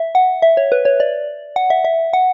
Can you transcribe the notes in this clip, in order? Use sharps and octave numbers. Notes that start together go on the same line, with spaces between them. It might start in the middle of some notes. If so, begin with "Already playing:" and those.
Already playing: E5
F#5
E5
C#5
B4
C#5
D5
F#5
E5
E5
F#5